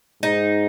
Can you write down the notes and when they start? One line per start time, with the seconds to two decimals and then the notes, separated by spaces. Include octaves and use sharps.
0.23 G#2 D#4